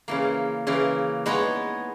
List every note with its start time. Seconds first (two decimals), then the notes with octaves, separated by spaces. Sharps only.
0.08 C#3 E3 A#3
0.67 C#3 E3 A#3
1.26 G#3 B3 D#4 G#4 C#5